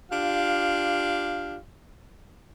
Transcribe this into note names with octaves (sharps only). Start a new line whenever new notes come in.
D4 F4 G4 F5